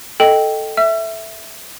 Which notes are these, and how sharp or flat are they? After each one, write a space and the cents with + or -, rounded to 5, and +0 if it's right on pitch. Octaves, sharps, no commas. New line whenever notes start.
A4 +0 D#5 +0 G5 -5
E5 +0 E6 +45